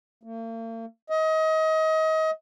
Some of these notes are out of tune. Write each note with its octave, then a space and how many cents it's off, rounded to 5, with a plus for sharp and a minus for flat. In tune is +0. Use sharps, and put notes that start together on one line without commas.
A#3 -45
D#5 +30